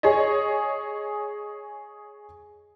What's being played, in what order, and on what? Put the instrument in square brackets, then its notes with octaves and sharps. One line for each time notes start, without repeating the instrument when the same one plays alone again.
[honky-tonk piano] G#4 C#5 D#5